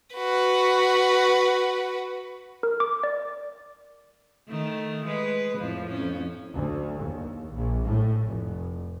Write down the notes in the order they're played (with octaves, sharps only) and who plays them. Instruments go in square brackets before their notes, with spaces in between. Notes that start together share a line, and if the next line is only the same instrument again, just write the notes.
[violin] F#4 B4
[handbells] A#4
D6
D5
[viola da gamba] D#3 A3
G#3 B4
F2 A2 F3
F2 C#4
[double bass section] D2
D#2
A#1
A2
F1